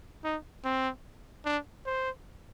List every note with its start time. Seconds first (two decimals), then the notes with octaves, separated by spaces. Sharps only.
0.24 D#4
0.64 C4
1.45 D4
1.86 C5